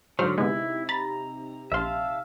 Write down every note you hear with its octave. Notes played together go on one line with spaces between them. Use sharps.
G#2 D3 F#3 C5 F6
C3 G#3 B3 D#4 E4
A#5 B5 A6
A#1 E5 F5 A5 C6